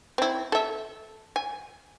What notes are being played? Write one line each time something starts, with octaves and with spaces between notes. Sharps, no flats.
C4 E4
A4 E5
G#5